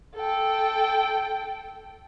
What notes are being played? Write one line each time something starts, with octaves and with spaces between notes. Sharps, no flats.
A4 G5